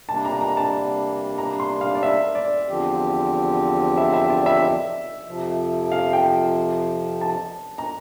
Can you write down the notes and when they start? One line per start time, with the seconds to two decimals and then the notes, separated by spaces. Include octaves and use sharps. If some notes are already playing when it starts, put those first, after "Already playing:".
0.09 C3 G3 A#3 D4 A5
0.25 A#5
0.41 A#5
0.57 A5
1.38 A#5
1.60 C6
1.81 F5
1.95 D5
2.03 E5
2.35 D5
2.67 E2 D3 F3 C4 G4
3.97 E5
4.14 E5
4.30 D5
4.46 E5
4.62 E5
5.27 F2 C3 F3
5.92 F5
6.13 G5
7.21 A5
7.78 A#5